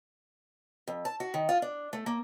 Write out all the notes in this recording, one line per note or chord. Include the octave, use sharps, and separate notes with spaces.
F2
A5
F#4
D#3
F4
D4
A3
A#3